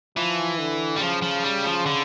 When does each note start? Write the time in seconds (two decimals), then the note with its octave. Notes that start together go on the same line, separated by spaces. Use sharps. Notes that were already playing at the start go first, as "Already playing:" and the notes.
0.16 E3 F3
0.59 D3
0.96 G3
1.01 C#3 F3
1.22 F3
1.43 G3
1.64 F3
1.86 D3